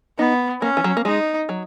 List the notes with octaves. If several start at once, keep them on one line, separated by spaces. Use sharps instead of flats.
B3 D#4
A#3 C#4
E3
F#3
A#3
G#3 D#4
F#3